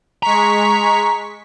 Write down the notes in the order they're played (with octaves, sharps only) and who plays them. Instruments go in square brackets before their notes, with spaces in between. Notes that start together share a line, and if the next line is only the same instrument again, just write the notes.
[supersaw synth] G#3 C#6 B6 [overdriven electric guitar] A#5